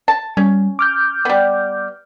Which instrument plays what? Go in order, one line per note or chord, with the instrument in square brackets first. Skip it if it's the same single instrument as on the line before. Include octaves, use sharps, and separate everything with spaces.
[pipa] A5
[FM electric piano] G3 [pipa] C#4
[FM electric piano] D6 F6 G6
[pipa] G3 B3